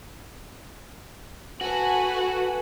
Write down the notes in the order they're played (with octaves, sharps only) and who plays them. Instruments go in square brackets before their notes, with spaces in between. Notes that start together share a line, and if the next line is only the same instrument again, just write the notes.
[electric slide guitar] F#4 [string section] A4 B4 G#5